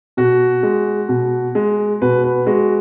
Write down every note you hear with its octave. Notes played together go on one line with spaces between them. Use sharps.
B2 F#4
G#3
B2
G#3
B2 B4
B4
G#3 F#4